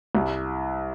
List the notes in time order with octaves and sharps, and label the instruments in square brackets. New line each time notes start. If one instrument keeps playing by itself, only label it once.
[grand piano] C2